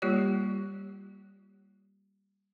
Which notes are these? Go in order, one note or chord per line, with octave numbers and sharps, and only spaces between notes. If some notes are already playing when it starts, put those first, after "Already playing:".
G3 A#3 F4 G4 C#5 D5